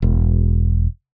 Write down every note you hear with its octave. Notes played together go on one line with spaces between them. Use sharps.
E1